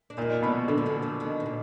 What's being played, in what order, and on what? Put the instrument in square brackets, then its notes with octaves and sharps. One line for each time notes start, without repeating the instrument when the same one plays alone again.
[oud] D4
[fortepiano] A#2 [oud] D#3 D#4
[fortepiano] B2 [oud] D3 D4
[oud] A#2 A#3 [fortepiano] D3
[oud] F3
F#2 F#3
F2 F3
D#2 D#3
B2
A#2